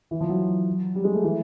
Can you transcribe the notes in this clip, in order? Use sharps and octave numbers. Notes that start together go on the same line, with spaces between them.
E3
F3
F#3
G3
G#3
A3
E3